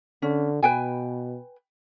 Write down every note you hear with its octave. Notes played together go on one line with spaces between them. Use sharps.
D3 C#4
B2 B4 G5 G#5